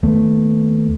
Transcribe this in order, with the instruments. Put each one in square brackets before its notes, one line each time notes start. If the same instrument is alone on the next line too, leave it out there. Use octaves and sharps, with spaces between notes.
[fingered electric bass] D#2 A3 B3